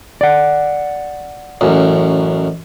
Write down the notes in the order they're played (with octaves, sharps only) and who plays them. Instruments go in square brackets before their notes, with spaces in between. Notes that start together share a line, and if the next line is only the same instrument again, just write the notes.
[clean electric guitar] D5 F#5
[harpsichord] A1 F#2